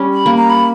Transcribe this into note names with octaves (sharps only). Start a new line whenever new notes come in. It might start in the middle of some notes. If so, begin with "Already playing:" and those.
Already playing: G3 C#4
B5
A#3
A#5
B5